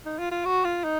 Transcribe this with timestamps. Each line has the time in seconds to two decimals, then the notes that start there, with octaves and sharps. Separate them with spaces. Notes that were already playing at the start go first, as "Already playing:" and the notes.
0.06 D#4
0.19 F4
0.31 F4
0.45 F#4
0.65 F4
0.84 D#4